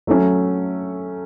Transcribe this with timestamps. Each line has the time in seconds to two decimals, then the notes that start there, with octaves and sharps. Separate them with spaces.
0.07 F#3 A3 C#4